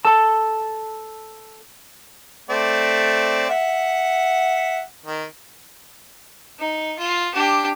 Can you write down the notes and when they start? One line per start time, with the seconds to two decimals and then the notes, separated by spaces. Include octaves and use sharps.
0.05 A4 A5
2.50 A3 C4 D5
3.50 E5 F#5
5.06 D#3
6.59 D#4
6.99 F4
7.33 D4 G4